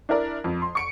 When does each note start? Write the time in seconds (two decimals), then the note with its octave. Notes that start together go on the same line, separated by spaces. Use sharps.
0.09 D4 E4 A#4 D5
0.44 F2
0.62 C6
0.75 C#6 C#7 D7